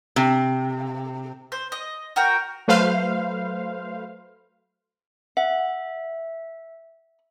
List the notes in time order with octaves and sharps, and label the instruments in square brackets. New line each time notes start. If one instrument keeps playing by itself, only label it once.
[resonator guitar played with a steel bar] C3
[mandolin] C5
D#5
F#4 A#4 G5
[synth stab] F#3 A3 B4 C5 F5
[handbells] E5 [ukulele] F#5